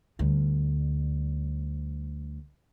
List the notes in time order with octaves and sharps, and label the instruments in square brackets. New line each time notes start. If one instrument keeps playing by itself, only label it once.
[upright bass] D2 G3